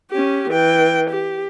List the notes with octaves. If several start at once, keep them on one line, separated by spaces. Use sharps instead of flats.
C#4 G4
E3 G5
G4